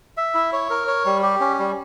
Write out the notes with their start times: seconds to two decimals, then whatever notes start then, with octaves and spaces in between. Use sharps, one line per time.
0.17 E5
0.34 E4
0.53 C#5
0.70 A#4
0.88 C#5
1.05 G3
1.23 G4
1.40 C#4
1.59 G3